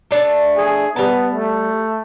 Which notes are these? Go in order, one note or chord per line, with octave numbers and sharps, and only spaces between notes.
A3 D4 A5
G#4
G3 B3 A5
A3